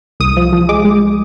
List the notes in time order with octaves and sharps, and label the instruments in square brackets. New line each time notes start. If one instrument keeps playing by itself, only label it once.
[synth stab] C2 D#6
F3
F3
G#3 D6
G#3